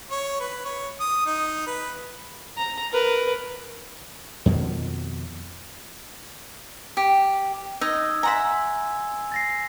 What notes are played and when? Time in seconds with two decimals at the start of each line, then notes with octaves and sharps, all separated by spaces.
0.11 C#5
0.40 B4
0.65 C#5
1.01 D#6
1.26 D#4
1.67 B4
2.57 A#5
2.92 A#4 B4
4.46 F2 B2 D#3 F3
6.97 G4
7.81 D#4 D#5 E6 G#6
8.23 E5 F#5 G#5 A#5 C6
9.32 A6 A#6 C7